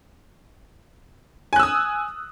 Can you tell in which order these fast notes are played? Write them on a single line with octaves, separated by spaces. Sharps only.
G#5 F#6 E6 D#6